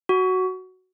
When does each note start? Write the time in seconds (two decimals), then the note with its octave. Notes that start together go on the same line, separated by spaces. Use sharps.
0.09 F#4